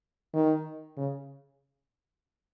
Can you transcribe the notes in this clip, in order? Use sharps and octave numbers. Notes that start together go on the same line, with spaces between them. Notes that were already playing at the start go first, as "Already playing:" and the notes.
D#3
C#3